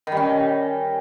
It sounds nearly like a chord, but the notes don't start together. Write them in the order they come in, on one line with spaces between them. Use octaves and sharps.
D#3 G3 C#4